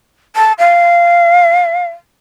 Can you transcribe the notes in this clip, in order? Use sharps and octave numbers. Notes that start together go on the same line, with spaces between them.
A5
F5